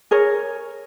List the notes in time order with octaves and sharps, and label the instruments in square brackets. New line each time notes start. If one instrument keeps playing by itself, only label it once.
[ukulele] G#4 A#4 C#5